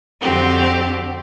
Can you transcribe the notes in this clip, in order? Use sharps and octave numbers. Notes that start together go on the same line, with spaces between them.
F2 D3 C4 F#4 G4